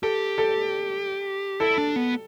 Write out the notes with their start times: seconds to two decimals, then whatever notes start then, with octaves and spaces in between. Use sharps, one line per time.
0.03 G4 A4
0.38 A4
1.60 E4 A4
1.78 D4
1.96 B3